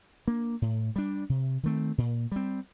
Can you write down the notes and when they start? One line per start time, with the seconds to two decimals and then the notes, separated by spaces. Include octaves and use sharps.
0.27 A#3 D4
0.62 A2
0.96 G3 D4
1.29 C3
1.63 D#3 A3 C4
1.98 A#2
2.32 G3 C4